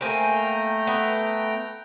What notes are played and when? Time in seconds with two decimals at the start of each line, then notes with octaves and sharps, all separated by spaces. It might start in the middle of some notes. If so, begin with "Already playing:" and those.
0.01 A3 A#3 C4 G5 G#5 A#5
0.87 B3